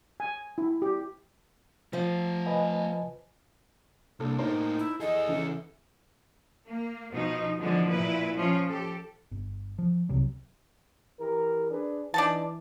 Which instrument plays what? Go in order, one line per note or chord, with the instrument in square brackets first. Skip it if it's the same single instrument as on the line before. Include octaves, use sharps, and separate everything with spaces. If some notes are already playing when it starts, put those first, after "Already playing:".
[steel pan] G#5
E4
G4
[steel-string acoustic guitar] F3 [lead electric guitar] A3 F5
[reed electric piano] B4 D#5 G#5
[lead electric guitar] C2 [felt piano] A#3 D4 A4
[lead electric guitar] A2 A#3 [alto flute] D#4 [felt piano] C5 A5 A#5
[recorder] E4
[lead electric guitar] E4 G#4 [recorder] A4 [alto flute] D#5
[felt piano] C#3 E3
[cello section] A#3
B2 F3 D#4
D3 E3 F3 G#3 B3
A#2 E4 B4
F3 C#4 F4
G4 A4
[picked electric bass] G1
F3
C2 C3 F#3
[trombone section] E3 G4 A#4
D4 G#4 B4
[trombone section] E3 [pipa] D4 D#4 A5